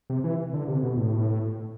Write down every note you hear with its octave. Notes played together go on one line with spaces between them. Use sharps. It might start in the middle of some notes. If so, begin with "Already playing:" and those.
C3
E3
D3
C3
B2
A2